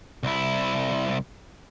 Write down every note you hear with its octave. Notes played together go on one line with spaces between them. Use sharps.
C2 E4